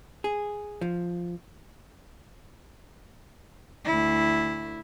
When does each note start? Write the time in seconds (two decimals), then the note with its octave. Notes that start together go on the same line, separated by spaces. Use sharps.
0.24 G#4
0.81 F3
3.85 D2 E4